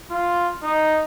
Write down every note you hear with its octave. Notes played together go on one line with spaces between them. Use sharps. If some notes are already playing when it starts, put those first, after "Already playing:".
F4
D#4